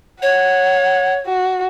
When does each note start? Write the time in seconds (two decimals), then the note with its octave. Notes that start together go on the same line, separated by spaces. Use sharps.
0.22 C#5 F#5
1.26 F#4